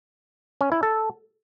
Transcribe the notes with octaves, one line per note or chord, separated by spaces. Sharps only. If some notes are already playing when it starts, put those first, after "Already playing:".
C#4
E4
A4